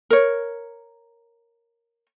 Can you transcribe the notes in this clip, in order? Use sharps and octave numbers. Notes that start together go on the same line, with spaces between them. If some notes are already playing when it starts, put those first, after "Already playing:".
A#4 C#5